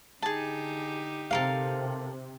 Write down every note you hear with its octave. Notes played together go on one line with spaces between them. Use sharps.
D3 D#4 G4 G#4 A5
C3 A4 A#4 F5